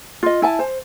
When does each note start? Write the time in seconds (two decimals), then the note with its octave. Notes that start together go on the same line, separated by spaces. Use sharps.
0.23 F4 D#5
0.42 E4 G#5 A5
0.59 C5